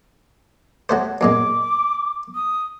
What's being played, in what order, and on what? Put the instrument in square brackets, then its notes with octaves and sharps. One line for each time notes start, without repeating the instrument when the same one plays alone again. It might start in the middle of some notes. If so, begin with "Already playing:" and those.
[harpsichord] F#3 A3 C5
[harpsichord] F#2 A#2 G#3 [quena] D6
[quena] D#6